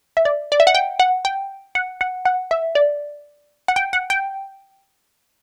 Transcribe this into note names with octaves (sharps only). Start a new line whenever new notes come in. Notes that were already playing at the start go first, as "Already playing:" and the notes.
E5
D5
D5
E5
F#5
G5
F#5
G5
F#5
F#5
F#5
E5
D5
F#5
G5
F#5
G5